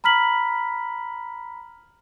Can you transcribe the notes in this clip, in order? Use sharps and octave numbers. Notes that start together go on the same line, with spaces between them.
A#5 B5 F6 B6 F#7